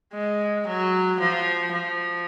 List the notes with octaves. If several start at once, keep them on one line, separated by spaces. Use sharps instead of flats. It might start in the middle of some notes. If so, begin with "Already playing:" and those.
G#3
F#3
F3
F3